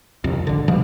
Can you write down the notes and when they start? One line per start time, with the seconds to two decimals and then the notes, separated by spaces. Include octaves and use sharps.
0.24 D1 C2 F2
0.47 G#1 D3
0.68 B2 F3 G3